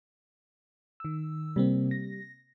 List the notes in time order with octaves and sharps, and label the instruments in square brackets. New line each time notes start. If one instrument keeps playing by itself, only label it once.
[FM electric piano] D#3 E6
[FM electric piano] C3 A#3 C4 [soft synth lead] G3
[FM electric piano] A#6